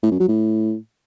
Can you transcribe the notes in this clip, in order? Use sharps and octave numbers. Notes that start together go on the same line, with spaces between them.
A2
F#2
F#3
A2